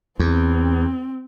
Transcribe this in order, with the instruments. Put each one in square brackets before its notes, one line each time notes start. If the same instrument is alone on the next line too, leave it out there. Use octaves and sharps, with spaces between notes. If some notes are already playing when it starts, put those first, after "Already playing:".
[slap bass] E2 [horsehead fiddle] C4